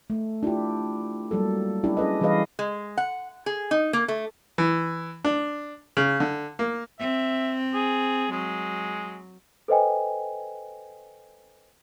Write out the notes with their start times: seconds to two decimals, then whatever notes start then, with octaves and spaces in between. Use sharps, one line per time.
0.10 A3
0.43 D4 E4 F4 G4
1.31 F#3 G3 A#3 A4
1.84 C#4 D4 E4 G4
1.97 C#4 G#4 B4 D#5
2.21 E3 G3 G#4 B4 D#5 F5
2.59 G#3
2.97 F#5
3.46 G#4
3.71 D#4
3.93 A#3
4.08 A3
4.58 E3
5.25 D4
5.97 C#3
6.20 D3
6.59 A#3
6.99 C4 E5
7.74 G#4
8.31 F#3 G#3
9.68 A4 B4 C5 D#5 G5 G#5